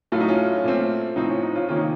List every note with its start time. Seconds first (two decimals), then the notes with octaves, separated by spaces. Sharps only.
0.12 A2 F#3 A3 F4
0.20 D#4
0.28 C#4 F4
0.64 A#2 A3 C4
1.16 A2 F3 C4 D#4
1.29 C#4
1.43 D#4
1.55 C#4 F4
1.68 C3 D#3 A#3 C#4 F4
1.76 D#4